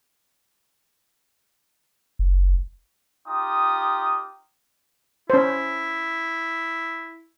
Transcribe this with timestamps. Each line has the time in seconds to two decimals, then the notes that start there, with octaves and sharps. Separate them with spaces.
2.19 F#1
3.27 D#4 F4 G4 D#6
5.30 C#4 E4 C5